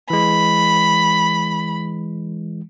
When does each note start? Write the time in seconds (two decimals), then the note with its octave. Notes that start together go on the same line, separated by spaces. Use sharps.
0.10 E3 G#3 B5